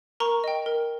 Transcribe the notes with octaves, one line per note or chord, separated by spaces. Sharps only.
A#4 A#5 C#6
D#5 G5
A#4